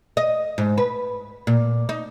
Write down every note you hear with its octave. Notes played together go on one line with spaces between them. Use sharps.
D#5
G#2
B4
A#2
D#4